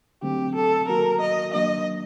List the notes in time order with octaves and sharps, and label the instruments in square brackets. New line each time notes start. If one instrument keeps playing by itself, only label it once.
[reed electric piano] D3 F#3 A3 C4 [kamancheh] G4
[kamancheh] A4
[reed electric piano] D#3 F#3 A#3 F#4 [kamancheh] A#4
[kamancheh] D#5
[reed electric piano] D#3 F#3 A#3 D4 [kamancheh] D#5